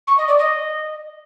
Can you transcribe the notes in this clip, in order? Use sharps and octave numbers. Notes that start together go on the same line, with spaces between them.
C#6
D#5
D5
D#5